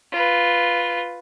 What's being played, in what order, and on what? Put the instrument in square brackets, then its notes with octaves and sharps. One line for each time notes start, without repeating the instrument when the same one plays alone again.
[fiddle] F4 B4